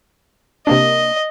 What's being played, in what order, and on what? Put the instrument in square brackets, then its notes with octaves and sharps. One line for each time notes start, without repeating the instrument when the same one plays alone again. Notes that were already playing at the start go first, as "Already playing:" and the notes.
[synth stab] C3 A#3 D4 [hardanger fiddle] D#5